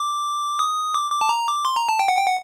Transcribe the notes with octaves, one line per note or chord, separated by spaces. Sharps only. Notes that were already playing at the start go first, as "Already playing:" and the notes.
Already playing: D6
D#6
D6
D6
A5
A#5
D6
C6
A#5
A5
G5
F#5
G5
F#5